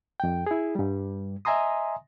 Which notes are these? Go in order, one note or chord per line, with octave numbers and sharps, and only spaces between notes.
F2 G5
E4 G#4
G2 G3
D#5 E5 G#5 A#5 C6 D#6